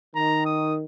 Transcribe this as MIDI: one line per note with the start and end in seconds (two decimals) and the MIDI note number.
0.15 0.85 51
0.15 0.43 82
0.45 0.75 87